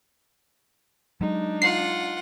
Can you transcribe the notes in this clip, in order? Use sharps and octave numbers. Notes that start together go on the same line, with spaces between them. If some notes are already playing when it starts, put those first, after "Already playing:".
F#3 G#3 D4 D#4
F4 F#5 C7